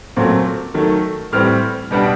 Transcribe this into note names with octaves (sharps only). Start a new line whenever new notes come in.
A#2 F#3 A3 C4
D#3 F#3 A3
A2 E3 G3 C4 F6
B2 G3 B3 D4